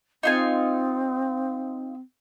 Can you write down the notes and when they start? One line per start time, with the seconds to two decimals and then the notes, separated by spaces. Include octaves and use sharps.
0.23 C4 D#4 F4 G#5